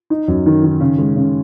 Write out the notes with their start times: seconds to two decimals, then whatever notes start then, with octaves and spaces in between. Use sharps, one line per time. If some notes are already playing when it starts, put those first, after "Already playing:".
0.10 D#4
0.28 F#2
0.46 D#3
0.63 D#3
0.80 C#3
0.98 G#3
1.16 C#3